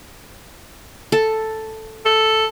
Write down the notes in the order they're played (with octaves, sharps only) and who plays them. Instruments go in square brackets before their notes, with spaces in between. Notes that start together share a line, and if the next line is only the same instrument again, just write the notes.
[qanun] A4
[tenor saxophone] A4